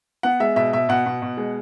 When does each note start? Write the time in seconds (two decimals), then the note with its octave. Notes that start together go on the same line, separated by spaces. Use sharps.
0.23 B3 F#5
0.40 G#3 E5
0.56 B2 E5
0.73 B2 E5
0.89 B2 F#5
1.06 B2
1.22 B2
1.37 G#3